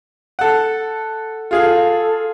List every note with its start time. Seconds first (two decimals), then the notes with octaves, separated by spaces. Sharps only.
0.39 A4 F#5
1.51 F4 G#4 A4 F5